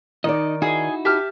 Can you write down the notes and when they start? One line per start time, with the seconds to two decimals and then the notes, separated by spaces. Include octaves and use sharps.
0.24 D#3 D#4 D5 D#5
0.62 D#4 E4 F#4 G#4 D#5
1.05 G4 E5 A5 F6